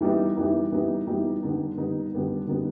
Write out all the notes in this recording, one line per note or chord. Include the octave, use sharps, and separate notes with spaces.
E3 G3 B3 D#4
E3 G3 B3 D#4
E3 G3 B3 D#4
E3 G3 B3 D#4
D3 G3 B3 D#4
D3 G3 B3 D#4
D3 G3 B3 D#4
D3 G3 B3 D#4